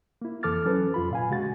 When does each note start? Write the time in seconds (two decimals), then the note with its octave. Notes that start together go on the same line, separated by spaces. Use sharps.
0.22 A#3 E4
0.43 F2 E3 A4 D6 F6 A6
0.65 F#3 C#4 A4 B4
0.94 F2 F4 B5
1.11 A#2 F5 G#5
1.30 C#3 G#3 F#4 A6